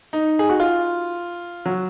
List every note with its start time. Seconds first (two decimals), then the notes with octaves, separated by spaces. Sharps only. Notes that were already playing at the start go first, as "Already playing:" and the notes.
0.13 D#4
0.39 G#4
0.49 F#4
0.60 F4
1.66 F#3